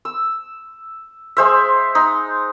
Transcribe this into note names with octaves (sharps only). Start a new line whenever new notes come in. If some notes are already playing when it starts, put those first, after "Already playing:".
E6
G#3 C5 E5
D#4